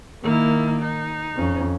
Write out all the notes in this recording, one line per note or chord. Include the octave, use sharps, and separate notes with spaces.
D#3 A#3 E4
D#4
F2 C#4